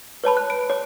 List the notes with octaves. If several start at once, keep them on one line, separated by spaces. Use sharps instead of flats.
B4 C#5 A5 B5
F#6
D7
C#5